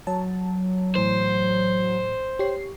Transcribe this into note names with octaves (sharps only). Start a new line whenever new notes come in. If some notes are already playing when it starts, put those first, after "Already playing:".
F#3 A5
A2 E3 C5
G4 C#5 C7